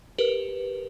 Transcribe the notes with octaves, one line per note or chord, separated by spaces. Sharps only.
G4 A#4 B4